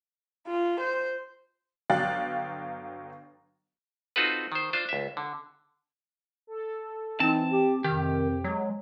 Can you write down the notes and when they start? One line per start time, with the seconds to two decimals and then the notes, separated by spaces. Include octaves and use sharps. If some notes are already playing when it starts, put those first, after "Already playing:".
0.47 F4
0.81 C5
1.90 G1 F#3 F5 G5 F#6 A6
4.16 C4 D#4 F4 F#4 A4 B4
4.52 D#3 C5
4.73 D4 F4 C5
4.89 C#2 E5
5.17 D3
6.47 A4
7.20 E3 C4 D#4 A5
7.51 G4
7.84 F2 C3 D#3 G4
8.44 F#3 G#3